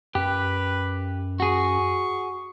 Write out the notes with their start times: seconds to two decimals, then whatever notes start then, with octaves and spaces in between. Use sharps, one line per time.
0.15 F#2 G4 B4
1.40 F#4 G#4 C#6